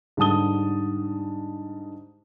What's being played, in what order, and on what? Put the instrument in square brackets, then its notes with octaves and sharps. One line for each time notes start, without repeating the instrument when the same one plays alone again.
[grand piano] G#2 D3 G3 A5 D#6 G7